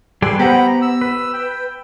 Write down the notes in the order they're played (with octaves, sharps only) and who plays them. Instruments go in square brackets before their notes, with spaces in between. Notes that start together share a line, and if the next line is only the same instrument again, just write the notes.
[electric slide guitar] G3 G#4 D5 [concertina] A4 B4 C6 [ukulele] B5
[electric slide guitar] B3 [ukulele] G4 C5 F#5 [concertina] A#5 B5
[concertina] E6
[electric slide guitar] B4
[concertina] G5